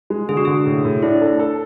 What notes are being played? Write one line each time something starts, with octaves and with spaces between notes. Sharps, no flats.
G#3
D3 G#4
F#4
D3 G#4
A2
A2
D4 E4
A4
A4